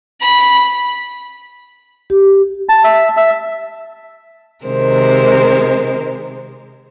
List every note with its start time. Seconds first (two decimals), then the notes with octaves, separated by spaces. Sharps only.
0.22 B5
2.10 G4
2.69 A5
2.84 E5
3.17 E5
4.64 C3 D#3 G#3 A#4 C5